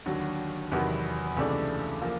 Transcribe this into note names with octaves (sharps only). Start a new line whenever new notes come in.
D#2 D3 F#3
E2 C3 D#3 F#3 B3
C#2 C3 E3 A3 D4
F3 A#3